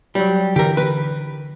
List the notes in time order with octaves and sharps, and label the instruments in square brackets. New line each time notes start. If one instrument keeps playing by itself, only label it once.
[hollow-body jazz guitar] F#3 G3
[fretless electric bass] D3 E3 [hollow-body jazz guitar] G4 A#4
[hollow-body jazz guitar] B4